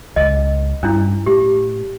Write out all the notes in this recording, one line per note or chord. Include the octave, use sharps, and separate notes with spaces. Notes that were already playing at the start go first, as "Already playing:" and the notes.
C#2 D#5
G2 C#4 D4 E4
A2 G4